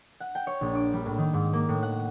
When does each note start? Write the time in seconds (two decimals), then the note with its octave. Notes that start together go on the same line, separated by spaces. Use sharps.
0.20 F#5
0.35 G5
0.47 C#5
0.61 A#1
0.75 D6
0.93 G3
1.06 A2
1.18 D#3
1.33 G#2
1.53 A#3
1.69 A2
1.83 F#5